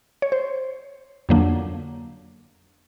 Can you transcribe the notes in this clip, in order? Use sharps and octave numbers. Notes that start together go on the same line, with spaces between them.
C#5
C5
F2 D3 F#3 A#3 D4